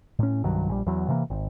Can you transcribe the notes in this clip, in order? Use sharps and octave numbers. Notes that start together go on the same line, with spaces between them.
A2 C#4
C2 G2 D#3 F#3
A#1 G3
E2 F#3
C3 E3 G#3 A#3
G#1